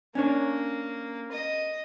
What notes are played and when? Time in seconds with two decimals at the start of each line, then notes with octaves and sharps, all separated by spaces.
0.15 A#3 C#4 D4 C#5
1.32 D#5